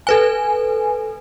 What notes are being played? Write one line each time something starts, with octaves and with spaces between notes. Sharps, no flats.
A4 B4 G#5